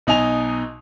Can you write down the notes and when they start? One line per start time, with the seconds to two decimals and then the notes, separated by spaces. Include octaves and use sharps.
0.07 B1 B2 D#4 D#5 G#5 F7